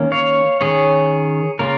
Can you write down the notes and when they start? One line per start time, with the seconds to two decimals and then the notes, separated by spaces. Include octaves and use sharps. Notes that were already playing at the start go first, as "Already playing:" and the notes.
Already playing: D#3 A#3 C#4
0.12 C#5 F5
0.61 D#3 C#4 G#4 C#5
1.59 C#3 A#3 C#4 F4 A#4